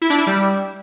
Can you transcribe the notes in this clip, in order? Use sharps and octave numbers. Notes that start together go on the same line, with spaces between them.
E4
D4
E4
G3